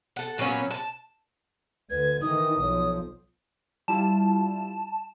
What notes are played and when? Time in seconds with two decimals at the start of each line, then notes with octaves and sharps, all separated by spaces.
0.16 A4 F#5
0.38 A#2 F#3 B3 C#4
0.71 A5
1.90 D2 B4 G#6
2.22 D#3 E3 D#4 D#6
2.61 B1 F3 C#5
3.88 G3 E4 F4 A5